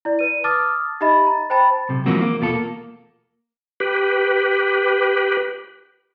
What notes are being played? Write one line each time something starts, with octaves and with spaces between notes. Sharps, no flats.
E4 D5
B4 D#7
A5 D6 D#6 F6 A6
D#4 G4 D#5 E5 B5 A6
A#5
C5 G5 A5 B5 A6
B1 C3
E3 F3 G#3 A#3 C4 F#4
A#3
E2 B2 F4 G4 A4
A#3
G4 B4